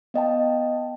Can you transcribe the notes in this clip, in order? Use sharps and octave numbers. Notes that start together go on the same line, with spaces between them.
B3 D#5 G5 A5